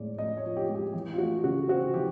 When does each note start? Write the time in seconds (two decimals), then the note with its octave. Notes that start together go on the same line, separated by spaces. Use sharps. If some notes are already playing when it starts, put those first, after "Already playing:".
Already playing: A2 G#3 D5
0.18 A2 D#5
0.37 C#5
0.44 F3
0.57 G4
0.69 G#3
0.75 G4
0.94 E3 G4
1.13 F4
1.18 A3 F#4
1.44 C#3 F#4
1.68 C4 F#4
1.94 E3 G4